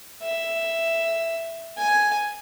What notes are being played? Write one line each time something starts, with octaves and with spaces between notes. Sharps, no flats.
E5
G#5